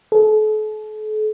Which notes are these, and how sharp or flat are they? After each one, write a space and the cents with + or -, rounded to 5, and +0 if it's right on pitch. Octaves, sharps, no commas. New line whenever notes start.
A4 -40